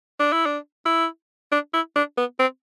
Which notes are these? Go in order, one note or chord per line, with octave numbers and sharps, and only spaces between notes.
D4
E4
D4
E4
D4
E4
D4
B3
C4